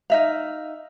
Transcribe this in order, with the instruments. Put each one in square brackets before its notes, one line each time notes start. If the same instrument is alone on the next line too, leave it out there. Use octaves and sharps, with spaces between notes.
[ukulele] D#4 E5 F5